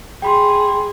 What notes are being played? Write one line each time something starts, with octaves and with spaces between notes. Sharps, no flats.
G#4 G5 B5 C6